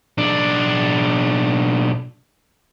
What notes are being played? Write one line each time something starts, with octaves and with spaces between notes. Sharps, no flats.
B1 D4